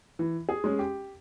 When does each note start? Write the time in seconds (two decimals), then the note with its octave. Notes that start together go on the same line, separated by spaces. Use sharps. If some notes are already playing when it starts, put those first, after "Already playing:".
0.19 E3
0.49 G#4
0.64 G#3 C#4
0.79 G4